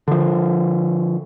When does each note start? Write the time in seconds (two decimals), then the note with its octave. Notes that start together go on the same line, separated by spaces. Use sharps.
0.08 D3 F3